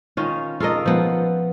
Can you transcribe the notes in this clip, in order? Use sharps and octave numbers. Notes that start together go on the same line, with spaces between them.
D#3 C#4 F4
F4 A4 A#4 D#5
F3 B3